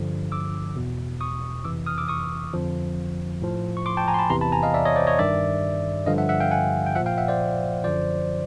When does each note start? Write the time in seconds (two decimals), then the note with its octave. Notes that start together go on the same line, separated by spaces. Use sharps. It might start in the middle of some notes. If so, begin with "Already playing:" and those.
Already playing: G2 D3 F3
0.32 D6 E6
0.76 E2 B2
1.21 C#6 D#6
1.64 F2 C3 E3 D6 E6
1.86 D#6 F6
1.98 D6 E6
2.09 C#6 D#6
2.53 F2 D3 F3
3.42 A2 F3
3.77 C#6
3.86 C6 D6
3.97 G5 A5
4.08 G#5 A#5
4.14 C6
4.19 A5 B5
4.30 E2 C3 E3 A#5 C6
4.41 A5 B5
4.52 G#5 A#5
4.63 D#5 F5
4.74 D5 E5
4.85 C#5 D#5
4.96 C5 D5
5.07 C#5 D#5
5.19 G2 D#3 D5 E5
6.06 G2 D3 F3 D#5 F5
6.18 E5 F#5
6.29 E5 F#5
6.40 F5 G5
6.51 F#5 G#5
6.86 G5
6.95 F3 E5 F#5
7.00 A#2
7.06 F5 G5
7.18 E5 F#5
7.28 C5 D5
7.84 F#2 D3 F3 C5 D5